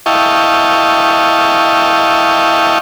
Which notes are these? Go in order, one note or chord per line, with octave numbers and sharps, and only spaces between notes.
E4 D#5 F5 G5 A5 C#6